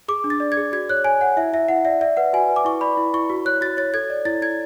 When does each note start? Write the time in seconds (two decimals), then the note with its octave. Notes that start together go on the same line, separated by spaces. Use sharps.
0.08 G#4 D6
0.24 D4
0.30 A6
0.40 D5
0.52 G#6
0.57 G#4
0.72 F#4 G#6
0.89 C#5 F#6
1.04 C#5 G#5
1.21 C#5 F#5
1.37 E4 E5
1.53 E4 E5
1.69 E4 F#5
1.85 D5 E5
2.01 D5 E5
2.17 B4 F#5
2.33 F#4 G#5
2.49 B4
2.56 D6
2.65 E4 C#6
2.81 D5 B5
2.97 E4
3.14 E4 C#6
3.30 F#4
3.45 C#5 F#6
3.61 F#4 A6
3.77 C#5 A6
3.94 A4 G#6
4.10 D5
4.25 E4 A6
4.42 E4 G#6